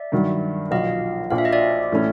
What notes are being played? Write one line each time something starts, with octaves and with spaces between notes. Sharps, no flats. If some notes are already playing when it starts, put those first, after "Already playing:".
Already playing: D5 E5
G2 D#3 F#3
B1 A#2 F3 D#5 F5
A#1 A#2 F3 F5
E5
D#5
D5 E5
A2 E3 A3 C#4